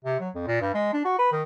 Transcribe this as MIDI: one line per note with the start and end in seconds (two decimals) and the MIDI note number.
0.05 0.17 48
0.20 0.29 54
0.35 0.43 41
0.47 0.58 46
0.61 0.73 43
0.74 0.91 56
0.93 1.02 62
1.05 1.14 66
1.19 1.31 71
1.32 1.43 51